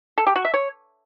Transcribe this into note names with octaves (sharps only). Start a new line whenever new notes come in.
A4
G4
F#4
E5
C#5